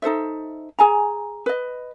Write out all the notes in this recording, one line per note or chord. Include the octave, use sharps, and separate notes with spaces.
D#4 A4 C5 E5
G#4 G#5 A#5
B4 D#5